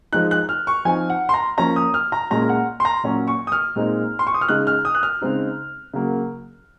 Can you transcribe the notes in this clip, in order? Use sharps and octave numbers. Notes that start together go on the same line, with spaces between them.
F3 G#3 D#4 F#6
F#6
F6
C#6
F3 C4 D#4 G#5
F#5
C6
A#5
F3 A#3 C#4 A#5
D#6
F6
A#5
A#2 G#3 C#4 A#5
F#5
C6
A#5
A#2 F#3 C#4
C#6
D#6
F6
A#2 G#3 C4 D#4
C6
C#6
D#6
F6
C#3 G#3 D#4 F#6
F6
D#6
F#6
F6
C#3 G#3 C4 D#4
C#3 F#3 A#3